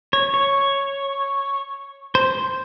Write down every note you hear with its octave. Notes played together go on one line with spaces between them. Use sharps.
C#5
C#5
C5